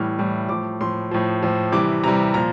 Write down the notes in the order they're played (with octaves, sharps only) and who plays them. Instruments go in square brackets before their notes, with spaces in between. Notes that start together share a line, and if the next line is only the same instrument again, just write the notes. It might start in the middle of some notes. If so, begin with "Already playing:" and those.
Already playing: [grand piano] A2 E3 G3 F6
A2 E3 G3
A2 F3 D6
A2 F3 C6
A2 F3
A2 F3
C3 E3 G3 D6
C3 E3 G3 A#5
A#2 F3 A#5